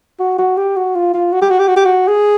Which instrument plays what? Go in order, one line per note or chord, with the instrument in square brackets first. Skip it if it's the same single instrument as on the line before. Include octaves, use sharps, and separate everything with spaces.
[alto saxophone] F#4
F#4
G4
F#4
F4
F4
F#4
G4
F#4
G4
F#4
G4
F#4
G#4